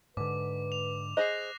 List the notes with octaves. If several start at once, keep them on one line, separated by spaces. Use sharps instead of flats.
G#2 D3 B4 D6
F7
G#4 C5 D#5 F#6 A#6 C7